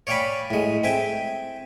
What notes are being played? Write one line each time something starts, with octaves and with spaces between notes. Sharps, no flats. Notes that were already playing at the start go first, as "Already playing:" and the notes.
C#5 D5 F5 G5 G#5 B5
A2 G#3
C4 E5 G5 G#5